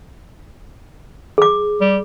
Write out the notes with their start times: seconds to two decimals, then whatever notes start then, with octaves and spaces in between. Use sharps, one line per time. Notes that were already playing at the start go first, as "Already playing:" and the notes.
1.38 G#4 D6
1.81 G3